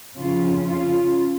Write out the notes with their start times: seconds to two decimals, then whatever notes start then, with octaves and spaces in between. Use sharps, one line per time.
0.16 F2 C#3 C#4 F4
0.65 C#4 F4